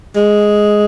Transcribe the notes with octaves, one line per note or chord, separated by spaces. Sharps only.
G#3